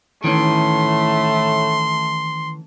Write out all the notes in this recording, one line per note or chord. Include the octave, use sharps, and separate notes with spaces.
A2 D#3 E3 A3 C#4 C6